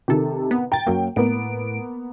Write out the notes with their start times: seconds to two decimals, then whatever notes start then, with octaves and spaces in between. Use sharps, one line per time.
0.08 C3 D#3 G4 A4
0.51 B3
0.72 G5 A#5 A6
0.87 F#2 F#3 A#3
1.16 A2 A#3 B3 D7